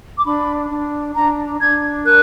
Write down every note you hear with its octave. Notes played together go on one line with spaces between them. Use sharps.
D6
D4 B5
D4
D4 A#5
D4 G#6
A#4 F#6